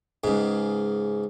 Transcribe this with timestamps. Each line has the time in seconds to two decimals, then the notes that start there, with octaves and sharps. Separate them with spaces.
0.24 C#2 G#2